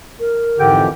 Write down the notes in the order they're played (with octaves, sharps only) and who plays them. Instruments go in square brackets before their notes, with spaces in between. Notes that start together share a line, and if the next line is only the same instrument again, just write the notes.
[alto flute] A#4
[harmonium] F2 E3 G4 [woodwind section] G#2 D3 G5